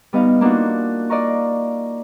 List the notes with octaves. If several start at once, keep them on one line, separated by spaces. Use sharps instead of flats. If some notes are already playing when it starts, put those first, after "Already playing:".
G3 B3 D#4 D#5 F5
A#3 D4 D#4 F4 F#4
D5 D#5 F5 A#5 C#6